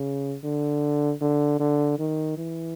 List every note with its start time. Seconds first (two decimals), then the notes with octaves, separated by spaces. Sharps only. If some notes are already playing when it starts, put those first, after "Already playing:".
Already playing: C#3
0.44 D3
1.21 D3
1.60 D3
1.99 D#3
2.38 E3